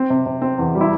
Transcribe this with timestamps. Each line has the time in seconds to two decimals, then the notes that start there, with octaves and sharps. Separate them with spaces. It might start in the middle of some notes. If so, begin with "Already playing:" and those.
Already playing: C4
0.10 C3
0.26 C3
0.42 C4
0.58 E2
0.75 G3
0.81 E4